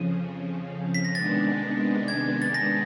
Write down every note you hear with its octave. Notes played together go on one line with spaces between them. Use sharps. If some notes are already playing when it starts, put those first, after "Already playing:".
Already playing: F2 C#3 F3 D#7
B6
A#6
C3 D#3 G#3 B3 D4 A6
G#6
A6
A#6